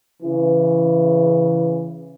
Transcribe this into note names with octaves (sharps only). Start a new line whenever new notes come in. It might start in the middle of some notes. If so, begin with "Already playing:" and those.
C#3 E3